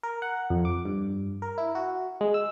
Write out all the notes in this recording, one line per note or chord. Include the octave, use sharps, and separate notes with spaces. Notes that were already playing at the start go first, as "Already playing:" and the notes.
A#4
F#5
F2
D6
G2
A#4
E4
F#4
G#3
E6